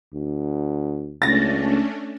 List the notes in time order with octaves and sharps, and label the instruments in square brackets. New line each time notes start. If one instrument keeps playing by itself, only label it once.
[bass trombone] D2
[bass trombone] C#2 [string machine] A3 C#4 D4 [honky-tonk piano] A6 A#6